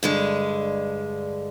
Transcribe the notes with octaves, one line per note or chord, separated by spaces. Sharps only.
G2 D3 G#3